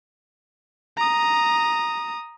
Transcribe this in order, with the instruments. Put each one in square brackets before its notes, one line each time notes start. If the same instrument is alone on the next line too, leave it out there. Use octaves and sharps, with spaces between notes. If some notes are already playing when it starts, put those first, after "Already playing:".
[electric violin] A#5 D#6